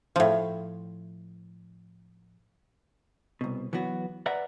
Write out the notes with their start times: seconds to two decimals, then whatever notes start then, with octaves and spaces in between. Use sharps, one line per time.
0.16 A2 F3
3.41 C2 B2
3.73 E3 F#3 B3 F#4
4.26 B4 D5 E5 F#5 A#5